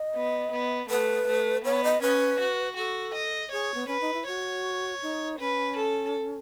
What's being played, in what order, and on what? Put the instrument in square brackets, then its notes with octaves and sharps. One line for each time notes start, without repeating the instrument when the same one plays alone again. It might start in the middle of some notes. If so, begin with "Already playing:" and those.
Already playing: [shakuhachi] D#5
[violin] B3
B3
[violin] A3 [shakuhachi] B4
[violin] A3
[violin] B3 [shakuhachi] C#5
[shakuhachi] D#5
[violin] C#4 [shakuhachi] B4
[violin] F#4
[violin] F#4 [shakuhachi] A4
[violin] D#5
[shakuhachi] G#4 [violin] C#5
[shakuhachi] B3
[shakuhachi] C#4 [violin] B4
[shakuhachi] D#4
E4
[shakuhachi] F#4 [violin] C#5
[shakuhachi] D#4
[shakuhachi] C#4 [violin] B4
[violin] A4